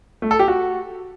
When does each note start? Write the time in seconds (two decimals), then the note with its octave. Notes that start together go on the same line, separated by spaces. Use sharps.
0.22 A3
0.31 A4
0.39 G4
0.48 F#4